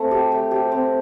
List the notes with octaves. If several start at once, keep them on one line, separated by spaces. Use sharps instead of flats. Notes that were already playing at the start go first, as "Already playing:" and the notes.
Already playing: A3 C4
G4
A3
G4
C4